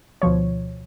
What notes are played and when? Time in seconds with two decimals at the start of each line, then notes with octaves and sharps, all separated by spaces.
0.22 D2 B2 F3 C#5